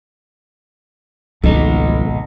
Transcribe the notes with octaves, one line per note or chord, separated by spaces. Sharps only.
G#1 C#2 B2 D#3 F3 A3 D#4